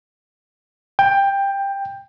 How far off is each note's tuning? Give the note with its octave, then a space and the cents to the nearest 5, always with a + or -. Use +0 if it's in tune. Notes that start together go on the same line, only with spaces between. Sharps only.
G5 +15